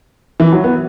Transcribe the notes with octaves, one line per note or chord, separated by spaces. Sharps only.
E3
F#3
B3